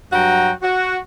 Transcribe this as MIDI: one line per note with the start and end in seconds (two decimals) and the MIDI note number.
0.12 0.51 43
0.12 0.51 54
0.12 0.51 66
0.12 0.51 79
0.12 0.51 82
0.62 0.97 66